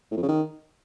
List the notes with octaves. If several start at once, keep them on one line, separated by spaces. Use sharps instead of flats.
A2
F2
C#3
D#3